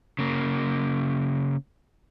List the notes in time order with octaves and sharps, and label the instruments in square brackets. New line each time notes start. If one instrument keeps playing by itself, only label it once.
[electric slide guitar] C#3 A#3